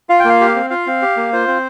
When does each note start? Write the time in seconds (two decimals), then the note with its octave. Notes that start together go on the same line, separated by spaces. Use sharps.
0.09 F4 F5
0.19 G5
0.25 A#3 F5
0.40 G4
0.55 C4
0.70 F4 F5
0.87 C4
1.02 G4
1.17 A#3
1.33 F4 C5
1.48 C4